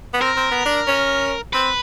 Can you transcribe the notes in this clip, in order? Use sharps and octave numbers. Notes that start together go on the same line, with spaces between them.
B3
C4 A#4
C4
B3
D4
C#4
C4 B4